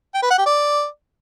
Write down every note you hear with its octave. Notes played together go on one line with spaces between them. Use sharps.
G5
B4
F#5
G4
D5